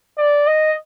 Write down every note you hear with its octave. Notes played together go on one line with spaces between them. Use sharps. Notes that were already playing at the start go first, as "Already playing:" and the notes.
D5
D#5